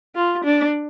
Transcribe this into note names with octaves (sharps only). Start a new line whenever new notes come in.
F4
D4